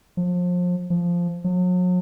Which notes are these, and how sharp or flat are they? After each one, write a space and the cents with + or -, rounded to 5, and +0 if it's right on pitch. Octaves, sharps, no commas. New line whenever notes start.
F3 +30
F3 -5
F#3 -40